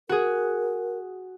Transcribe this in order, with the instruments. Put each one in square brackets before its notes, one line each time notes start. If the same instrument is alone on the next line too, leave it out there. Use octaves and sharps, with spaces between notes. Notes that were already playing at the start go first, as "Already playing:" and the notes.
[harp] F#4 G#4 [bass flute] A#4